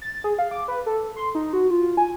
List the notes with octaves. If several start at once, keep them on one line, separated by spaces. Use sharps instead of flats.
A6
G#4
F5
D6
B4
A4
C6
D#4
F#4
F4
G#5